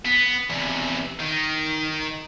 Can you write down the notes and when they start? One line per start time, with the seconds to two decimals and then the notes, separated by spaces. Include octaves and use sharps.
0.05 B3
0.50 E2 C3
1.20 D#3